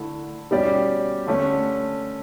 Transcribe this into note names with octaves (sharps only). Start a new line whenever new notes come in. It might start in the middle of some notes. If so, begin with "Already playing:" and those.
Already playing: D3 A3 E4
B2 G3 C#4 G4 D5
D3 A3 C#4